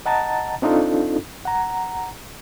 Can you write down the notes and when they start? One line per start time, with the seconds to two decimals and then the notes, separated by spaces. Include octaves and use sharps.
0.06 D#5 F#5 A5 A#5 A6
0.62 C4 D4 D#4 F4 A4
1.45 F#5 A#5